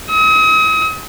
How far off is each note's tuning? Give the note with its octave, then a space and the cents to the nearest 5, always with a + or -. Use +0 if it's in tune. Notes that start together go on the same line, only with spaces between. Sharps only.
D#6 +40